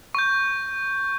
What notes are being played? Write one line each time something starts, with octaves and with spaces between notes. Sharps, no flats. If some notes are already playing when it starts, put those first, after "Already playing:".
C#6 G6